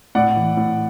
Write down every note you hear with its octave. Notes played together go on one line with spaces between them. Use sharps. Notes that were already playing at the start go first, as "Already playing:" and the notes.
A2 D5 F#5
E3
A2